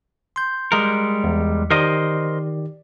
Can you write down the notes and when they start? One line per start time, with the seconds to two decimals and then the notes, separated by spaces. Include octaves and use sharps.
0.36 C6 G6
0.72 G3 G#3 A#4
1.24 E2
1.70 D#3 G4 A#4 C5 D5 D#5